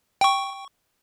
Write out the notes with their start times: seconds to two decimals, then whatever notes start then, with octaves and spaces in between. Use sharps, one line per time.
0.21 G5 C#6